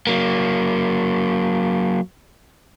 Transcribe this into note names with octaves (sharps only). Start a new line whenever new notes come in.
F#3 A#3